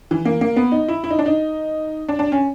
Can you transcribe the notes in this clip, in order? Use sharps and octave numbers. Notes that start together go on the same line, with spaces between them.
E3
A#3
A#3
B3
D#4
E4
E4
D#4
D4
D#4
D4
D4
C#4